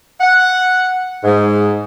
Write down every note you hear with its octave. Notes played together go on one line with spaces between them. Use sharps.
F#5
G#2